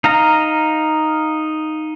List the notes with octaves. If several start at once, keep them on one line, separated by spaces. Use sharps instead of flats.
D#4 F5 A#5